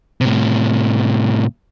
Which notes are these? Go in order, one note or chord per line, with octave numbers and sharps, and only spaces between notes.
A2 C3